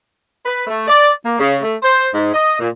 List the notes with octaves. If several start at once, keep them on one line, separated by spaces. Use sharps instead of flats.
B4
A3
D5
A#3
C#3
A3
C5
G#2
D#5
A#2